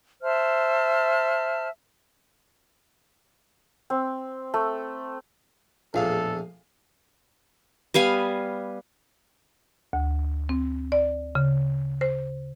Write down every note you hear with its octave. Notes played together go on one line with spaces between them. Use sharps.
C5 E5 A5 F6
C4
A3
A#1 E2 A2 F3 G#4 A4 F5
G3 B3 F5 G#5
D2
C4
D5
C#3
C5